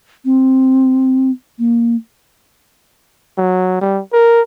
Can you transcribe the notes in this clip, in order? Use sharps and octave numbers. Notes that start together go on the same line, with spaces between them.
C4
A#3
F#3
G3
A#4